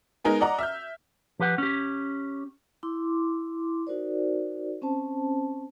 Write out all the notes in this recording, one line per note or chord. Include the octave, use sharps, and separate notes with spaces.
G#3 B3 D#4 A#4 G#5
D5 D#5 F#5 A#5 D6
E5 F6 G6
F3 G4 B4 F#5
C#4 G4
E4 C6 D6
D#4 F#4 A#4 C5 D5
C4 C#4 C5 A5